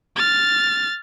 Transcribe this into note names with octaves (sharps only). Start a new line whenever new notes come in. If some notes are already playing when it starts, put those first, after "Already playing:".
F6 A6